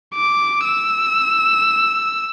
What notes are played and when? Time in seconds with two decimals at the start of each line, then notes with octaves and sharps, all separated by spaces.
0.15 D6
0.65 E6